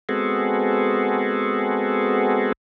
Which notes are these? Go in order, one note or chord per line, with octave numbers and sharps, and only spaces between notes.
G#3 B3 C4 F#4 G#4 A4